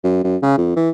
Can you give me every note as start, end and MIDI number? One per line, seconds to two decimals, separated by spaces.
0.04 0.20 42
0.24 0.36 42
0.42 0.58 49
0.58 0.72 41
0.76 0.90 52